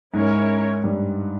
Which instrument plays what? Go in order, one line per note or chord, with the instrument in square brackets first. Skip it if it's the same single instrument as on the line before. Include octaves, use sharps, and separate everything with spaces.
[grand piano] G#2 [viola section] C#4 E4 A#4 C#5
[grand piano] G2